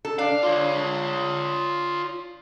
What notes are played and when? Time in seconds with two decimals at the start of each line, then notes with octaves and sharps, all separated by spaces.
0.05 A4
0.19 D4 F5
0.43 F4 C#5